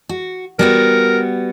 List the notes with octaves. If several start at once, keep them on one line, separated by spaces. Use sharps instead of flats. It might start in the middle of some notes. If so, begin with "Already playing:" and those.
F#4
G3 B3 F#4 A#4